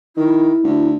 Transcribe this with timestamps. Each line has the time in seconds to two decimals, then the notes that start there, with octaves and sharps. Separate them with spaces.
0.17 D#3 E4
0.63 D2